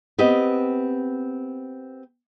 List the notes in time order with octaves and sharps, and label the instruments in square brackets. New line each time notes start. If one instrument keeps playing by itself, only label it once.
[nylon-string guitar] B3 C4 G4 D#5